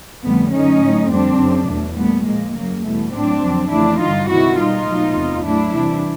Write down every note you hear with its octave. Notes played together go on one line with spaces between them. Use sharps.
F2 D3 G3 A3 B3
F#2 D3 F#3 A3 C#4 D#4
A2 F#3 A3
F2 D3 G3 C4 D4
F#2 C#3 F3
E2 B2 F#3 A3
A#2 G3 A3 B3
A#2 F3 G#3 A#3
F#2 C#3 F#3 A#3
E2 B2 G3 A3
A2 F#3 A3 C4 D4
F2 D3 F#3
F2 C#3 E3 A3 D4 E4
G2 D3 G3 D#4 F4
C3 D#3 G#3 E4 F#4
B2 G3 D#4 F4
B2 F#3 A3
E2 C3 E3
A2 F#3 A3 D4 E4
C3 E3 G3